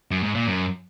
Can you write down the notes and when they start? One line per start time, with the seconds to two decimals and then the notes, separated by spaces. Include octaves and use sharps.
0.11 F#2
0.23 G#2
0.35 A#2
0.47 F#2